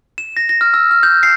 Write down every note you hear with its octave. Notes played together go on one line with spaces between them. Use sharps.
E7
A#6
A#6
F6
E6
F6
G6
C7